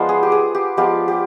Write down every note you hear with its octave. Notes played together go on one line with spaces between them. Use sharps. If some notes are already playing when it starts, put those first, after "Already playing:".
Already playing: F3 G#3 B3 F4 C5 D5
G#4
G4
G#4
G4
F3 G#3 B3 F4 G4
G4